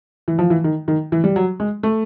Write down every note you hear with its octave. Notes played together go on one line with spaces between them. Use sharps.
E3
F3
E3
D#3
D#3
E3
G3
F#3
G#3
A3